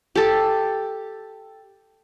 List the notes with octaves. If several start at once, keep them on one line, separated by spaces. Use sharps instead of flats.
G4 A4